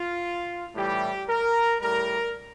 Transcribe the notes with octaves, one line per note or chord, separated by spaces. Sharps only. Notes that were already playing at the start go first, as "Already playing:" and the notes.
Already playing: F4
A2 E3 G3 G4
A#4
A2 G3 A#4